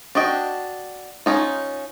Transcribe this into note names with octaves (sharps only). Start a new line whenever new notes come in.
D4 F#4 D#5 G5
C#4 D#4 F4